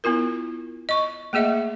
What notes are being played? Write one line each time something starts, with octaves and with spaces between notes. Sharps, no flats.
B3 E4 F4 A#4
D#5 C#6
A3 A#3 G#4 D#5 E5